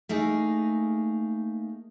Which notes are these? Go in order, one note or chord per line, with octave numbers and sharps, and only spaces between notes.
A3 A#3 D#4 G#4